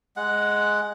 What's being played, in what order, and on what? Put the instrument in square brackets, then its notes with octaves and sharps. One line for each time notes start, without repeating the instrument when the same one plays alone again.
[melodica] G#3 F#5